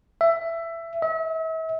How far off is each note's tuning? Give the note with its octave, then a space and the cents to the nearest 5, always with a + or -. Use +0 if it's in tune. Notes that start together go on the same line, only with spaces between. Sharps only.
E5 +15
E5 -40